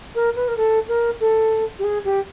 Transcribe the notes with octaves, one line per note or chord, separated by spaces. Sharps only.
A#4
B4
A#4
A4
A#4
A4
G4
G#4
G4